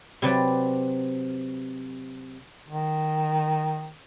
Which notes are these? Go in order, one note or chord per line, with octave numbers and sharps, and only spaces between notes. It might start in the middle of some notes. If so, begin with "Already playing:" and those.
C3 F#3 B4 D5
D#3